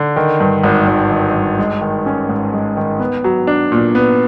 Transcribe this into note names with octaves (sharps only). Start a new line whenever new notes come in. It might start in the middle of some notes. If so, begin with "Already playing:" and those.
Already playing: D3
D#3
G2
G#1
G#1
D#3
G2
G#3
D#3
C#4
G#2
G#3
D#3
B3
F#3
D4
A#2
B3